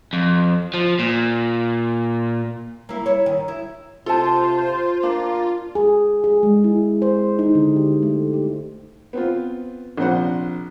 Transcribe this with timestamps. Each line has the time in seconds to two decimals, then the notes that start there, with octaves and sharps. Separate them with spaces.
0.13 F2
0.74 F3
0.99 A#2
2.89 A#3 E4
3.06 E4 C#5
3.26 D#3
3.48 E4
4.06 C3 F4 A4 C5 A5
5.03 A#3 D4
5.75 G#4
6.24 G#4
6.43 G#3
6.64 E4
7.02 C5
7.39 D#4
7.55 D3
7.76 G4
8.03 A3
8.33 G4
9.13 B3 C4 F4
9.97 A#1 C3 C5 F#5